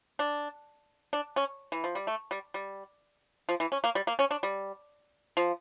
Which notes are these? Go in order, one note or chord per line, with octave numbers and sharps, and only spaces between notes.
D4
D4
C#4
E3
F3
G3
A3
G3
G3
F3
E3
C#4
A#3
G3
A#3
C#4
D4
G3
F3